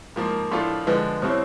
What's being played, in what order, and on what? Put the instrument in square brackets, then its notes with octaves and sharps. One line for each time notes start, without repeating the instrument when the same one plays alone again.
[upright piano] G#2 F3 A#3 [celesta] A#4
[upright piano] A2 F3 A3 D4 F4
[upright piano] D3 F3 G#3 [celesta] B4
[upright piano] B2 G3 C4 E4 [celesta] C5
[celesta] C#5